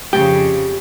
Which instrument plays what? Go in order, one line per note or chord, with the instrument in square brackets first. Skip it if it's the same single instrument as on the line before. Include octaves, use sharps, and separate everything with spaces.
[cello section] F2 C#3 [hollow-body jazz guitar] G4